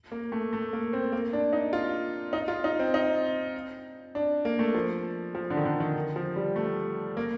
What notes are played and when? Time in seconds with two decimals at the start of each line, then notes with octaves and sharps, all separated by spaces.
0.12 A#3
0.32 A3
0.53 A3
0.73 A#3
0.93 C4
1.12 A#3
1.33 D4
1.53 D#4
1.73 F4
2.33 D#4
2.48 F4
2.64 D#4
2.79 C4
2.94 D#4
4.15 D4
4.45 A#3
4.59 A3
4.74 F3
5.35 F3
5.50 D3
5.57 D#3
5.65 D3
5.80 D#3
6.16 F3
6.36 G3
6.56 A3
7.17 A#3